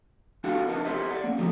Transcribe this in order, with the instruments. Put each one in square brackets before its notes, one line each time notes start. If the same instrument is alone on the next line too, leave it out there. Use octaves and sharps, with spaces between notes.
[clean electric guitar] D4 F#4 G4 A4 F5 F#5
D4 A#4 B4 A5
G4 A#4 C5 D#5 E5
D5 F#5
A#3 C#4
D3 F3 F#3 A3 D#4